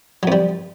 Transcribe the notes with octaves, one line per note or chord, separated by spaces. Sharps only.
F2 F#3 G3